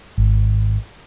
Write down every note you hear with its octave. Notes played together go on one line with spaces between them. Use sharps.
G#1